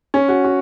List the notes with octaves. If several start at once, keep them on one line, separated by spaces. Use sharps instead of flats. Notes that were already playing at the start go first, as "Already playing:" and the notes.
C#4
F#4
F#4